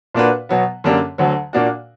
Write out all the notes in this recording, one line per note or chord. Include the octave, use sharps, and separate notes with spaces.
A#2 A#3 D4 F#4 B4
B2 F#3 B3
F#2 D3 A#3 D4 G4
D2 D3 F#3
A#2 A#3 D4 F#4